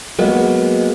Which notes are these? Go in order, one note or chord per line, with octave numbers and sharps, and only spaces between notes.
F#3 G#3 A#3 B3